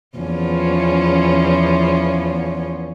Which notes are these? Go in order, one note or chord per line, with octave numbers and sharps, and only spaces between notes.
E2 F3 C#4